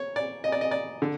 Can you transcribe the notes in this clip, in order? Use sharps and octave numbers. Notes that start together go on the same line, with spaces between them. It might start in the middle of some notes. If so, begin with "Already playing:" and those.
Already playing: C#5
D5
D#5
D5
D#5
D5
D3